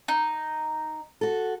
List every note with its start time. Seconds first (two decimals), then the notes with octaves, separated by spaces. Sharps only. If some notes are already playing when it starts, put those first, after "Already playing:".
0.08 D#4
1.21 F#4 A4